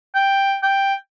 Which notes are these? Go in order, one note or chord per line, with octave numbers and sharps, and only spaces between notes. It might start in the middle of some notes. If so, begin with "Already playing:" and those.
G5
G5